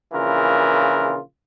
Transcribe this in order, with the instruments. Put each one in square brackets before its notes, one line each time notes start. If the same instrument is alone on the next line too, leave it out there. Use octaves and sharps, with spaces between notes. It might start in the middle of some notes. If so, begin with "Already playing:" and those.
[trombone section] A#1 C#3 E3 F4 A#4